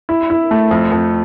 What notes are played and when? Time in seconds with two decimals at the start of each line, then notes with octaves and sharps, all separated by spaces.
0.09 E4
0.30 E4
0.51 A3
0.71 F2
0.92 F2